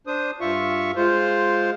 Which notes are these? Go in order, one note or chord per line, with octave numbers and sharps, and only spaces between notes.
D4 C5 D#6
G2 F4 E5 C#6
G#3 F4 C5